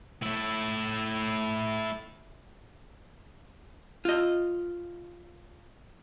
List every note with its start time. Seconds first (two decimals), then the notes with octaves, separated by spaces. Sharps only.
0.23 A3 E4
4.05 F4 D#5